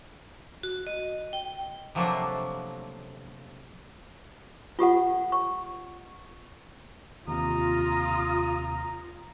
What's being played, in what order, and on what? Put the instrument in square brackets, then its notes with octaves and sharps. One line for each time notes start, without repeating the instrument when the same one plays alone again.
[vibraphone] F#4
D#5
G5
[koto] C3 F3 F#3 A3 A#3 D4
[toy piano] F4 G4 A4 F#5
C#6
[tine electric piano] D#2 C3 [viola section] F4 [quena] A#5 [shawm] D#6